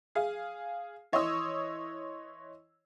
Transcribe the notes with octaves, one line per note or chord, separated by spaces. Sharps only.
G#4 F5
E3 C#5 D#5 C6 D#6 E6